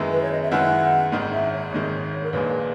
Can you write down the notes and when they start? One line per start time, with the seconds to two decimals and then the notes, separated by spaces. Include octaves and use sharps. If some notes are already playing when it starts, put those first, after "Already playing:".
Already playing: F#2 D#3 G#3 B3 E4
0.12 B4
0.22 C#5
0.31 D#5
0.42 E5
0.51 F#2 D#3 G#3 B3 E4 F#5
1.12 G#1 G#2 D#3
1.32 E5
1.52 C#5
1.72 G#1 G#2 D#3
2.23 A#4
2.33 A#1 A#2 G#3 B4